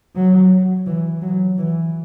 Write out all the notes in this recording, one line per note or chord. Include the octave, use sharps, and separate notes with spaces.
F#3
E3
F#3
E3